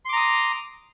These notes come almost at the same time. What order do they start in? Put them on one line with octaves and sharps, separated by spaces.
C6 D6 A#5 D#6